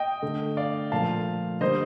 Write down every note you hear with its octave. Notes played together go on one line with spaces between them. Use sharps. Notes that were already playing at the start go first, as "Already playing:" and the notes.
Already playing: D#5 G5
D3 A3
D5 F5
A#2 F3 A3 F5 A5
D3 G3 A#3 C5 D#5